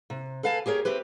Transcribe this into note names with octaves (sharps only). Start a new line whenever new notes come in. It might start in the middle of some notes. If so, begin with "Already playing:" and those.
C3
A4 B4 F5 G#5 A5
G4 G#4 A#4 C#5
A3 C4 G4 B4